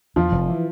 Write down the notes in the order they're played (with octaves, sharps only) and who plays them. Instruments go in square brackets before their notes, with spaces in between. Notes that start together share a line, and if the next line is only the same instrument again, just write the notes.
[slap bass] E2 [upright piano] F3 F4
[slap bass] F1
E3